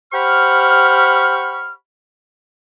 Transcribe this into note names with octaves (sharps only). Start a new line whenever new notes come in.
G4 C5 F#5 B5 C#6 F6